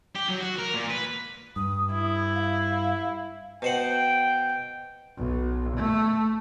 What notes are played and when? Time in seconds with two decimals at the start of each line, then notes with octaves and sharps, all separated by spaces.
0.15 G4
0.28 F#3
0.40 F#4
0.58 A#4
0.74 A#2
0.90 B4
1.56 G2 D#6
1.93 E4
2.35 F5
3.62 B2 C5 F#5 G5
5.18 B1
5.76 A3